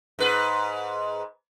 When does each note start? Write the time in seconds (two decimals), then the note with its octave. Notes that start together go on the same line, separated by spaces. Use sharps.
0.19 G#2 B4